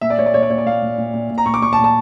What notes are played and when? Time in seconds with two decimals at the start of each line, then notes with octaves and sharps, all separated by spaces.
0.01 A#2 E5
0.10 D5
0.18 A#2 C#5
0.26 D5
0.34 A#2 C#5
0.43 D5
0.50 A#2 C#5
0.58 D5
0.66 A#2 F5
0.82 A#2
0.98 A#2
1.14 A#2
1.30 A#2
1.38 A#5
1.46 A#2 C#6
1.54 D6
1.62 A#2 C#6
1.73 A5
1.79 A#2
1.84 A5